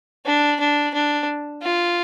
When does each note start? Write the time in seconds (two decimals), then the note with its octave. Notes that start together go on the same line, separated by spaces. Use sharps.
0.26 D4
0.60 D4
0.94 D4
1.63 F4